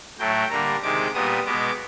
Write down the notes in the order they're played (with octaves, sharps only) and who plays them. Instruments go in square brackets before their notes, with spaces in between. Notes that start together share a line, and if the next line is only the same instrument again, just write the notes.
[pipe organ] A2 F#3 A3 G5
D3 G3 A#3 A#5
C3 D#3 G#3 D6
A#2 G3 B3 D#6
B2 G#3 B3 D6